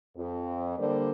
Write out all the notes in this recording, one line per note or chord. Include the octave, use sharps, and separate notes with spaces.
F2
D3 G3 A#3 C5